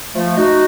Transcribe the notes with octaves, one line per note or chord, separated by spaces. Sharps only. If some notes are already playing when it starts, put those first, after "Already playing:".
F3 A3
D#4 F#4